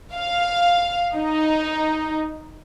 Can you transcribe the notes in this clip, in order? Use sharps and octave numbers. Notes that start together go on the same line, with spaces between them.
F5
D#4